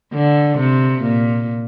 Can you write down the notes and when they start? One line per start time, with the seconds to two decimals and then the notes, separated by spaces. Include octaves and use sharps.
0.14 D3
0.59 C3
1.02 A#2